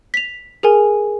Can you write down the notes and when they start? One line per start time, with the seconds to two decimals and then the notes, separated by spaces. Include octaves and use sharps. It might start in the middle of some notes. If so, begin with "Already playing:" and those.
0.14 B6 F7
0.63 G#4 A#4 G#5